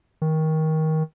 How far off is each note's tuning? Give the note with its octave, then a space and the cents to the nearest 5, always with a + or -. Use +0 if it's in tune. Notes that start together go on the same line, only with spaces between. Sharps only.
D#3 +20